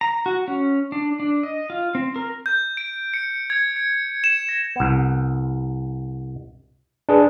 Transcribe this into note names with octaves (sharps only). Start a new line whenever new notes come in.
A#5
F#4
C#4
D4
D4
D#5
F4
C4
A#4
G6
D7
C#7
G#6
C#7
E7
A#6
C2 B3
D4 G#4 B4